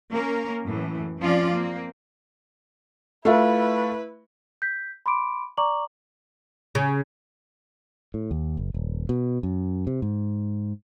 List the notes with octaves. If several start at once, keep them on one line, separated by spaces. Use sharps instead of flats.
A#3 C#4 A#4
F#2 A2 E3
F3 C4 C#4 F4 D5
A#3 C4
A3 E4 F4 B4 E5
G6 B6
B5 C6 D6 D7
D5 A#5 C#6 D6 F#7
C#3
A2
D#2
F#1
D#1
B2
F#2
C3
G#2